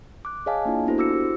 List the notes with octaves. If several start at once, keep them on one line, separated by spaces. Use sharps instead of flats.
D6 F#6
G#4 C#5 D#5 F5 G#5 A5
A#3 D4 E4 F4
B3 D4 E4 F#4 A4 C5
F#4 D6 E6 A#6 C#7
E4 G4 C5